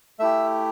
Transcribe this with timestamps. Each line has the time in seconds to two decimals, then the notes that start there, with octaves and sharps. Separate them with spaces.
0.19 A3 E4 G4 E5 E6